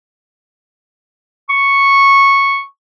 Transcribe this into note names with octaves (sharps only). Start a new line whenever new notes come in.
C#6